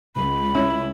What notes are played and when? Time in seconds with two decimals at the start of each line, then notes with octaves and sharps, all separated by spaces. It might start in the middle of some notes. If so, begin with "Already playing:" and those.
0.16 C#2 B5
0.55 C#4 E4